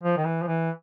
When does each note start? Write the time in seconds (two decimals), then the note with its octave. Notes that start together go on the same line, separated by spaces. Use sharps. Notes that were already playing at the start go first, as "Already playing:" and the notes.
0.03 F3
0.17 D#3
0.25 E3
0.42 F3
0.47 E3